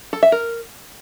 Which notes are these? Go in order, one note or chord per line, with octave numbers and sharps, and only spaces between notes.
A4
E5
A#4